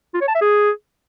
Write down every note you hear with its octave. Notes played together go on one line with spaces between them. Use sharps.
F4
C#5
A5
E5
G#4